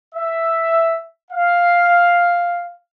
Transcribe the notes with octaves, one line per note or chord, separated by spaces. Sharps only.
E5
F5